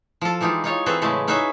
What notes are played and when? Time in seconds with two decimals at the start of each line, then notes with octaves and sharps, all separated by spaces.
0.21 F3 A4
0.41 E3 G#3 D#4 F4 G4
0.64 D#4 F4 C#5 F5
0.86 E3 C4 G#4 A4 B4 A#5
1.02 A2 C#3 G#3 A3 A4
1.28 C#4 D#4 F#4 G#4 B4 E5